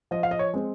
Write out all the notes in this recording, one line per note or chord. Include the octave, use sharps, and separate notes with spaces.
F3 D#5
F5
D#5
C#5
G#3 C4